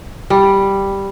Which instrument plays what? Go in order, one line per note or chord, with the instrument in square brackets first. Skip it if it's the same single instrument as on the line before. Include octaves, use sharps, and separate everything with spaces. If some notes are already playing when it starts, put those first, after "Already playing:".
[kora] G3